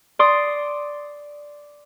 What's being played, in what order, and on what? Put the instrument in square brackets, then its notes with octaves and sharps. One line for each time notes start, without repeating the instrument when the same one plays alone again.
[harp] D5 C6 D#6